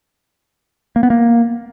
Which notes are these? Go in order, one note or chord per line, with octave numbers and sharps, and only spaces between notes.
A#3
B3
A#3